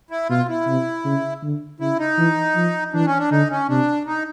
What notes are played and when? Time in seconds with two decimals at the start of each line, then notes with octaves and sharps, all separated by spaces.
0.11 E4
0.30 B2 F4
0.49 E4
0.67 C3
1.04 C#3
1.43 D3
1.80 C#3 E4
1.99 D#4
2.18 E3
2.56 F3
2.93 E3 D4
3.06 C#4
3.18 D4
3.31 D3 D#4
3.50 C#4
3.69 C3 D4
4.06 D#4